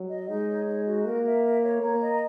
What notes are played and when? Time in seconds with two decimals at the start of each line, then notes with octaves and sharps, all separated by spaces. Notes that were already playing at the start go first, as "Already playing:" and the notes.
Already playing: F#3
0.09 D#5
0.28 G#3 D#4
0.48 C#5
0.67 D#4
0.86 F#4
1.05 A#3 A#4
1.24 E5
1.44 A#4
1.62 C#5
1.81 A#3 A#5
2.01 D#5